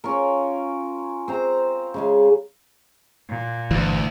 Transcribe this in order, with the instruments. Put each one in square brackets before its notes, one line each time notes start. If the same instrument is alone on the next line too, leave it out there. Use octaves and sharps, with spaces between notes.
[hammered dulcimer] C#4 F4 A#4
C4 C5 A#5
C#3 G#3 F5
[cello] A#2
[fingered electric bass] G1 E3 [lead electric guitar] D2